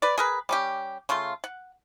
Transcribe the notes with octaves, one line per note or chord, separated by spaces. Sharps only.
B4 D5
G#4 A#4 B4
G3 C#4 G4
C#3 A3 F4 C6
F#5